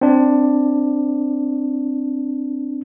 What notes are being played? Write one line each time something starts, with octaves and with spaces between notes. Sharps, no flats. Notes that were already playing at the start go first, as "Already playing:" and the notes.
C4 D4